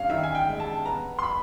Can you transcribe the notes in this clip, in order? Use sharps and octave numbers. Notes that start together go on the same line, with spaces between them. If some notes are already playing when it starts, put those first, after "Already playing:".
Already playing: G2 C#4 F5
D#3 E5
G#5
G5
G#3
A5
B3 A#5
C6
B5